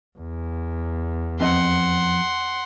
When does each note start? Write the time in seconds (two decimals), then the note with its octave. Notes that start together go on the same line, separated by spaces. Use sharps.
0.18 E2
1.40 F2 C4 D#5 F#5 C6